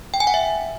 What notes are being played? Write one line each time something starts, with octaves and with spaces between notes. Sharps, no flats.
G5
G#5
F#5
E5